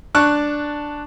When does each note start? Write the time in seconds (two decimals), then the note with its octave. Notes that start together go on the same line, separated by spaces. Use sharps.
0.15 D4 A5 C#6 F#6